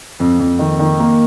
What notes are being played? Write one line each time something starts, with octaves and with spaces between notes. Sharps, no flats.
F2
F2
D#3
D#3
A#3